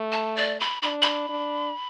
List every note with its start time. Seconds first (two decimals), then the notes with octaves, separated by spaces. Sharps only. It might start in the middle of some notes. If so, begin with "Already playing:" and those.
Already playing: A3
0.12 A5
0.37 D5
0.60 B5
0.82 D4 B5
1.02 B5
1.29 D4